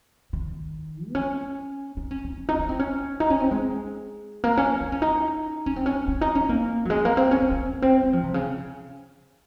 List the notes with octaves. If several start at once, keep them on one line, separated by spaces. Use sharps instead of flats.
D#3
C4
C#4
D#4
C#4
D#4
C#4
D#4
C#4
C4
C#4
D#4
C#4
C4
G#3
A#3
C#4
D#4
C#4
D#4
C#4
C4
C#4
C#4
D#4
C#4
A#3
F#3
G#3
A#3
C4
C#4
C#4
C4
A#3
C4
G#3
F3
C3
C#3